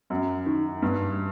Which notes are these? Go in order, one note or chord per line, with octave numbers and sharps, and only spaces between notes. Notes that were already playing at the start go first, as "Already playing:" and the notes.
F#2
D#3
G2